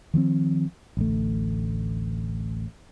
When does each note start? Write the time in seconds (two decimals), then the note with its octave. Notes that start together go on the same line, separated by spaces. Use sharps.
0.14 D#3 F3 A#3 C4
0.97 A1 D2 A3